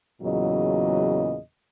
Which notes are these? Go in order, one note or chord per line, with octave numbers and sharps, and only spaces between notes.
E2 A#2 C#3 F#3 D#5